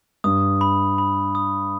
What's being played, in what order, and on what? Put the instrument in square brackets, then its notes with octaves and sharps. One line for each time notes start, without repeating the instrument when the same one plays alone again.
[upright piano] G2 [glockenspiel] D#6
[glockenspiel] B5
B5
D#6